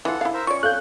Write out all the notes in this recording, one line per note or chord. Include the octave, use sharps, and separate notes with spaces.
E3 F4 A4 F#5
E4 F5
A#4 C5 E5
C#4 F4 D5 C#6
A4 F5 F#6 G6